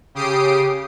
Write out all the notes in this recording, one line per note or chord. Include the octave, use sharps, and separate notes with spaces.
C#3 G4 D#6 C7 D7